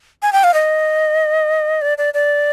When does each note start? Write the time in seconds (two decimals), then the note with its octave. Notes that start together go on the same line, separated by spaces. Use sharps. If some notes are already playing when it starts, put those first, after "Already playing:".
0.22 G#5
0.33 G5
0.44 F5
0.54 D#5
1.82 D5
1.98 D5
2.14 D5